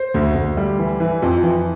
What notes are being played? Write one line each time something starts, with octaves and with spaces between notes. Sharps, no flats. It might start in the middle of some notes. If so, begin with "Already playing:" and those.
Already playing: C5
D2
D2
G3
E3
E3
F2
E3